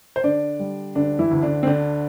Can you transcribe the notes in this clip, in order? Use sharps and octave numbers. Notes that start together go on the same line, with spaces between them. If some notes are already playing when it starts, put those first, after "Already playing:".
C5
D3 D4 D5
G3
D2 D3 D4
E3 E4
D2
D3 D4
C4
D3 D4